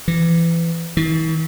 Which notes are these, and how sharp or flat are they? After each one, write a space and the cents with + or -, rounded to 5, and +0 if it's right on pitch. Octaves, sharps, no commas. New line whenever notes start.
E3 +25
E3 -45